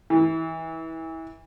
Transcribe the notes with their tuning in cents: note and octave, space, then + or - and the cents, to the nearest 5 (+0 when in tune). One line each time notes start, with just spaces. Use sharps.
E3 -25